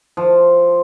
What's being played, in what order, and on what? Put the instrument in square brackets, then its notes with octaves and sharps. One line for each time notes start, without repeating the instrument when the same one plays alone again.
[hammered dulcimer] F3